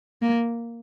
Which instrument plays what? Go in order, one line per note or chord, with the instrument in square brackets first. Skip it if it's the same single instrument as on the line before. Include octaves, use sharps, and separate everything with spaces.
[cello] A#3